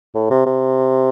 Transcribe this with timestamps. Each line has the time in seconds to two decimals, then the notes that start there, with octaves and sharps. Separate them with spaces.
0.15 A2
0.30 C3
0.46 C3